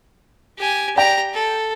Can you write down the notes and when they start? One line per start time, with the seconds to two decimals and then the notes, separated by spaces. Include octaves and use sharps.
0.58 G4 G#5
0.96 G4 D5 G5 A#5
1.34 A4